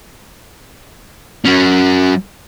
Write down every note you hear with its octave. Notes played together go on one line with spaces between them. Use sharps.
F#3 C#4